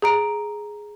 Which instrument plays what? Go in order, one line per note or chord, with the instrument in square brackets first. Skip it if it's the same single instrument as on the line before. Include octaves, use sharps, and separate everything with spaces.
[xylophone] G#4 A#5 D7